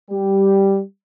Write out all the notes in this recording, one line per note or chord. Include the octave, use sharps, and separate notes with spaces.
G3 G4